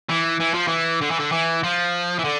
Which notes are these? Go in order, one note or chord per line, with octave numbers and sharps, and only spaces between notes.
E3
E3
F3
E3
D3
E3
D3
E3
F3
E3
D3